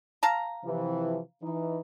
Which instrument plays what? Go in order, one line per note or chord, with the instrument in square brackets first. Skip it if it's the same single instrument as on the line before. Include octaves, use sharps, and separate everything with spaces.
[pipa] F5 A5 A#5
[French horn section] C3 E3 F3
E3 D#4